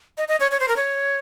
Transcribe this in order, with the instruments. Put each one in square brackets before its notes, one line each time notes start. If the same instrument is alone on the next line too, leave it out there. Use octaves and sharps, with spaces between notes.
[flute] D#5
D#5
C#5
C#5
C5
A#4
C#5